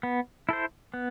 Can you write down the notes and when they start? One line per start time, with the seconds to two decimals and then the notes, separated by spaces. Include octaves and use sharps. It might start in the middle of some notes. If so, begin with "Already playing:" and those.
0.03 B3
0.49 E4 A4 C5
0.94 B3